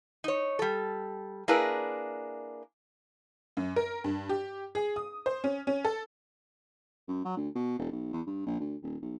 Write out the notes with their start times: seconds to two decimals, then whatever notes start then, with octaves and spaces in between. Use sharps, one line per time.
0.24 D#4 C#5
0.59 G3 A4
1.48 A#3 D4 E4 G#4 A#4 B4
3.57 F#2
3.76 A#4
4.04 G2
4.29 G4
4.75 G#4
4.96 D#6
5.26 C5
5.44 C#4
5.67 C#4
5.85 A4
7.08 F#2
7.25 F#3
7.37 D2
7.55 B2
7.79 E1
7.91 B1
8.13 E2
8.27 G2
8.46 A#1
8.60 D2
8.82 D#1
9.02 B1